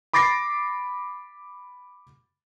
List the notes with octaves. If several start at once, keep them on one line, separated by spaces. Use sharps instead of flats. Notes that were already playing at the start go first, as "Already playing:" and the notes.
B5 D6 A6 A#6 C7